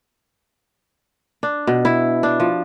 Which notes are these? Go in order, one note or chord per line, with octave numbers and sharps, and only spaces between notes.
D4
B2
E4
D4
F3